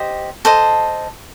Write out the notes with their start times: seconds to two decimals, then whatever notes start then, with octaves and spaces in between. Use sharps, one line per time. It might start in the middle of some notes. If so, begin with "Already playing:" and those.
Already playing: G4 C5 D#5
0.45 A4 C5 D#5